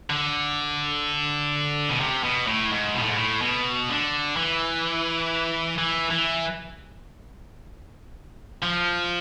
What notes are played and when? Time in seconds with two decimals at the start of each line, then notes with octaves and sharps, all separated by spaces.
0.10 D3
1.90 B2
2.00 C3
2.23 B2
2.47 A2
2.71 G#2
2.94 B2
3.02 A2
3.09 G#2
3.16 A2
3.41 B2
3.89 D3
4.37 E3
5.78 E3
6.10 E3
8.62 F3